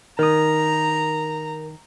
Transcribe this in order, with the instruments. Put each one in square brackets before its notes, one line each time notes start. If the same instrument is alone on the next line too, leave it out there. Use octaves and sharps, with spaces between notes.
[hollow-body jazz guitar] D#3 [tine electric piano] A#4 D#6 [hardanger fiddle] A#5